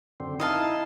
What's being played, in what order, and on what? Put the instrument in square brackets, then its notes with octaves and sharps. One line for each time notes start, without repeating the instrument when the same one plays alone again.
[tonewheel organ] F#2 D3 C4
[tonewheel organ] D#4 E4 [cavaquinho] D#5 F5 A5